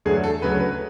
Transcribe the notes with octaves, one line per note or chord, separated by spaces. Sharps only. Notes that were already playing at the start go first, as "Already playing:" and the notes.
E2 D3 F#3 A3 G#4
A4
D2 C#3 F#3 A3 B4
B4